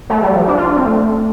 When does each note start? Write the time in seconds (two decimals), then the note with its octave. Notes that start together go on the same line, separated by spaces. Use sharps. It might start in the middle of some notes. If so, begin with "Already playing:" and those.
0.10 A3
0.22 G3
0.35 F3
0.48 D4
0.57 F4
0.66 D4
0.76 C4
0.85 A3